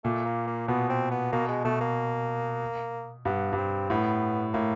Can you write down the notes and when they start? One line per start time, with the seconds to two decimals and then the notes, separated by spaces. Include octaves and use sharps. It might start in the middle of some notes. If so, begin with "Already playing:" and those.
0.04 A#2 A3
0.26 A#3
0.47 A#3
0.68 B2 B3
0.89 C4
1.11 B3
1.33 B2 A#3
1.49 G#3
1.65 B2 A3
1.81 A#3
3.25 G2 B3
3.53 G2
3.58 C4
3.90 A2 B3
4.54 A2 A#3